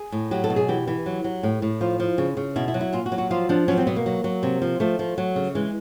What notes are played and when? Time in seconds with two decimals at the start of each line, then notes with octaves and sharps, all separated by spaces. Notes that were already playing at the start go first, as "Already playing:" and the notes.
Already playing: G#4
0.12 A2
0.31 F#3 G4
0.44 A4
0.50 B2
0.56 G#4
0.68 E3 G4
0.87 E3
1.06 F#3
1.24 F#3
1.43 A2
1.62 A2
1.81 F3 F4
2.00 F3
2.18 C#3
2.37 C#3
2.56 B2 E4
2.68 E4
2.74 F#3
2.81 E4
2.93 A#2 F4
3.06 F#4
3.12 F#3
3.18 F#4
3.31 F3 F4
3.49 F3 D4
3.68 F#3 C#4
3.77 C4
3.87 B2 B3
3.96 A#3
4.06 F#3
4.24 F#3
4.43 C3
4.62 F3
4.80 F3 A3
4.99 F3
5.18 F#3
5.36 C#3
5.55 E3 G#3